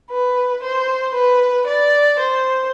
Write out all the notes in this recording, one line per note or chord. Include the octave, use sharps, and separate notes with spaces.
B4
C5
B4
D5
C5